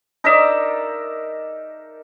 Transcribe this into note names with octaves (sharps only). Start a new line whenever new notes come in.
D#4 A#4 D5 E5